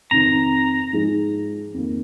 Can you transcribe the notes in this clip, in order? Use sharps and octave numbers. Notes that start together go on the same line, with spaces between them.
F2 C3 D#3 C4 A#5
G#2 F3 G#3 D#4 G#4
F2 D#3 A#3